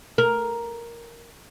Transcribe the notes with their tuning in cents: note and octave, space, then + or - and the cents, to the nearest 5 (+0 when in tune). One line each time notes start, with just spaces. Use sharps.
A#4 +5